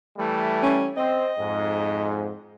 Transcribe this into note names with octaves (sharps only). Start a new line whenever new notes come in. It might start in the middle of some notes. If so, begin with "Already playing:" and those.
E3 G3 A3
C#4
C4 D#5
F2 G#2